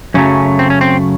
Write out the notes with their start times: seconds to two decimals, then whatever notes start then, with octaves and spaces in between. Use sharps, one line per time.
0.14 F#2 C#3 F#3 A3 C#4
0.59 C4
0.70 C#4
0.81 C4